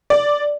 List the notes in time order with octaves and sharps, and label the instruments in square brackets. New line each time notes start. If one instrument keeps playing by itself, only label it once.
[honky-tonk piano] D5